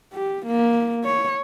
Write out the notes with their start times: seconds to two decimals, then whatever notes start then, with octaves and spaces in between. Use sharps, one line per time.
0.14 G4
0.46 A#3
1.04 C#5